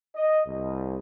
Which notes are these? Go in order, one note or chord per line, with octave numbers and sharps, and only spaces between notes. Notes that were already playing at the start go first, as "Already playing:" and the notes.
D#5
C2